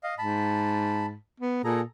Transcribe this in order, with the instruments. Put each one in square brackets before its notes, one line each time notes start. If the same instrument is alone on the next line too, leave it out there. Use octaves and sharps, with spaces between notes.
[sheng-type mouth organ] D#5 F5
[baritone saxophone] G#2 [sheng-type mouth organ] A5 B5
[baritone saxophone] B3
[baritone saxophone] A#2 [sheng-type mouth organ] G#4 A4 A#5